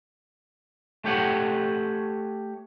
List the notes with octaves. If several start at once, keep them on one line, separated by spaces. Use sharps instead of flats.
A3 G4 C#5 F#5